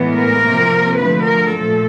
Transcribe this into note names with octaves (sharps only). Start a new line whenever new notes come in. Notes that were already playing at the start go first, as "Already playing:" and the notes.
Already playing: A2 E3 G#3 B3
A#4
C3 F3 A#3
D3 F3 A3 B4
A#4
A#2 F3 A3 A4